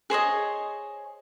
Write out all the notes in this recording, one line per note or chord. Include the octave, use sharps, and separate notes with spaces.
G#4 C5 C#5 D#5